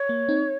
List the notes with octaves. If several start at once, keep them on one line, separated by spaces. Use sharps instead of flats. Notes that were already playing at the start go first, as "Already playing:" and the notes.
Already playing: C#5
A#3
C4 D#4